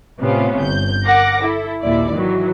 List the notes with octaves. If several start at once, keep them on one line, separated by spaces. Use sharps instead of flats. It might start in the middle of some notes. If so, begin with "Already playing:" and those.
A2 C3 B3 C#4 F4
G1 G6
A#4 F#5 D6 A#6
E4 A4
G#1 D#2 A#2 E4 D5
D#3 E3 F#3